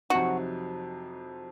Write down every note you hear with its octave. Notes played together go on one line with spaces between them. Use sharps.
F2 C3 F#3 C4 D#4 F#4